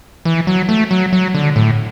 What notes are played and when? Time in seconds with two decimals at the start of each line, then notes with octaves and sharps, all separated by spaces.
0.25 E3
0.47 F#3
0.69 A3
0.91 F#3
1.13 F#3
1.34 D3
1.56 A2